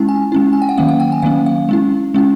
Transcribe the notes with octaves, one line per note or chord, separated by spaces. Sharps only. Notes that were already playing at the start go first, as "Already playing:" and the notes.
Already playing: G#3 C#4 E4 A5
G#5
G#3 C#4 E4
G#5
G5
F#5
D#3 F#3 A#3 C#4 F5
F#5
G5
G#5
D#3 F#3 A#3 C#4 F5
F5
G#3 C#4 E4
G#3 C#4 E4